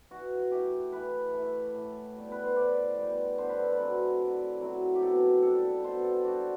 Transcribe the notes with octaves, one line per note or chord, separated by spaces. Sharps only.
E3 F#4
A3 E4 G4
E3 B4
A3 E4
A2
G3 B3
B4
C5
A2 D5
G3 B3
D3 C5
B4
A4
B4
F#3 C4 E4
D3
F#3 C4 E4
G4
B2 A4
G3 D4 A4
B2 C5
A4
G3 D4 F#4